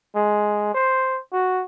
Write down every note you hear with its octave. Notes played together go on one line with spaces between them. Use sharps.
G#3
C5
F#4